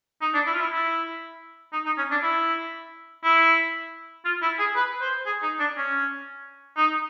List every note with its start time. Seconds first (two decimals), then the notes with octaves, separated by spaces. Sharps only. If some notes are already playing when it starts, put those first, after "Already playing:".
0.21 D#4
0.34 D4
0.47 E4
0.53 F4
0.60 E4
0.72 E4
1.73 D#4
1.86 D#4
1.98 C#4
2.11 D4
2.23 E4
3.24 E4
4.25 F4
4.42 E4
4.59 G#4
4.76 B4
5.01 C5
5.26 G#4
5.43 D#4
5.60 D4
5.77 C#4
6.77 D#4